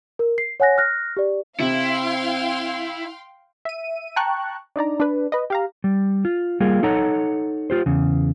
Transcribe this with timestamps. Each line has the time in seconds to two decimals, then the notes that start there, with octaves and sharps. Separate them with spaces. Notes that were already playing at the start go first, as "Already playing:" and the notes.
0.19 A#4
0.38 C7
0.60 C#5 F#5 G#5 F#6 A#6
0.78 F6 F#6 A#6
1.17 G4 D5
1.60 C3 C4 E4 F5 G5 C6
3.65 E5 D#7
4.16 G5 A5 A#5 C#6 F#6
4.76 D4 D#4 D5 A#5
5.00 D4 B4
5.32 B4 D#5
5.50 G4 F5 A#5
5.84 G3
6.25 F4
6.60 G3 A#3 F4 G#4
6.83 D#4 A4 C#5 F#5 A#5
7.70 F4 G4 C5
7.86 E2 C#3